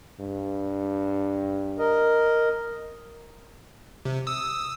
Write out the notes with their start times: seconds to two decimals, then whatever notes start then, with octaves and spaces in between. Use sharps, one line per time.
0.20 G2
1.79 A#4 D#5
4.05 C3
4.27 D#6 E6